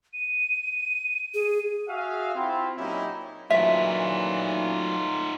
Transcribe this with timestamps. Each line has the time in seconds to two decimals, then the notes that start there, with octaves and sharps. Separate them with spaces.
0.13 D#7
1.34 G#4
1.88 F#4 G#4 E5 F5
2.35 C4 E4 F4
2.77 A#2 F#3 C#4 D#4 E4 G4
3.50 A#2 E3 F#3 A3 D#4 F4 E5